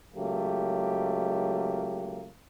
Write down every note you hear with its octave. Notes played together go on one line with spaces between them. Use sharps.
C#2 F#3 A3 A#3 G4